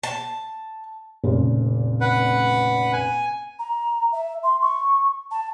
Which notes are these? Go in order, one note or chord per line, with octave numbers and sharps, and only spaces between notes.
A5
F1 A#2 C#3
B4 F#5
G#5
A#5
E5
C6
C#6
A5